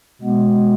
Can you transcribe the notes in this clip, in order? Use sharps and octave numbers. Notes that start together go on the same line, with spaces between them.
B2 G#3 B3